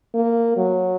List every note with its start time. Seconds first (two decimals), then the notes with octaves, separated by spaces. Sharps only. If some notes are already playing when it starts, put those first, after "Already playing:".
0.15 A#3
0.57 F#3